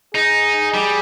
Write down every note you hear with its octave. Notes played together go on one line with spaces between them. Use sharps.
D#4 G#4
G3